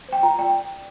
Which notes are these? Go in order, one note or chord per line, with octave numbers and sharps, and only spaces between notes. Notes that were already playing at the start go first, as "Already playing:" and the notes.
C5 G5
F4 A#5
D5 G5